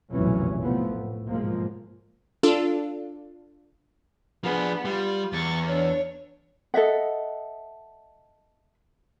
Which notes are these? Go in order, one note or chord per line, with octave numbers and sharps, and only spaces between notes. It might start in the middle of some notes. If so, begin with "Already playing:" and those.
F1 B1 F#2 A#2 E3 C#4
A#1 C3 F3 A3 B3
A2
B1 G#2 F3 G#3 A#3
D4 F4 A4
F3 B3 D4 G#4
G3 F4
E2 C#6 A6
D4 C#5
A4 D#5 E5 F#5